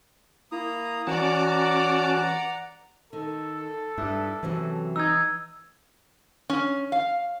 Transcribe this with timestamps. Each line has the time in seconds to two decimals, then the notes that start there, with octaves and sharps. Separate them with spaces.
0.52 A#3 E4 A#5 D#6
1.07 E3 C#4 F#4 D5 F#5 A5 A#5 D6
3.13 D#3 A4
3.98 G2 E4
4.43 F#2 C3 E3 F#3
4.96 D#4 E6 G#6
6.50 C#4
6.92 F5